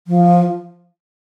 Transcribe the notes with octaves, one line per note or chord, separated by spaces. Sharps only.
F3